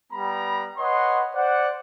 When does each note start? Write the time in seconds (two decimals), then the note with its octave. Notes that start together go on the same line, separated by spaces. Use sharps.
0.12 G3 B3 A#5 B5
0.78 B4 C#5 D#5 F#5 C6
1.35 C5 D5 F#5